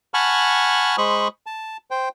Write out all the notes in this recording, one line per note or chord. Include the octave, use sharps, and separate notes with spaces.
F#5 G#5 A5 B5 C#6 F6
G#3 C5 B5 C#6 D#6
A5
C5 G5